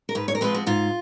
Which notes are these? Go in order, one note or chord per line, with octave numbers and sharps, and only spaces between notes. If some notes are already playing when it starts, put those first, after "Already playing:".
A#4
G#2 B4
C#5
A#4
F3 G#3 C4 B4
F#4
G#2 F4